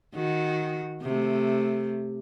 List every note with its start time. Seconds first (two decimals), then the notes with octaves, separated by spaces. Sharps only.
0.14 D#3 F#4
1.02 C3 A3